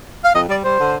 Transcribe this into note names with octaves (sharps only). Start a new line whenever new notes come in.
F5
F2 D#5
G3 D5
G3 C5
D3